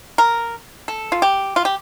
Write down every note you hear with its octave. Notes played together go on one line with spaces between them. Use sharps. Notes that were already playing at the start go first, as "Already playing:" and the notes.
A#4
A4
F4
G4
F4
G4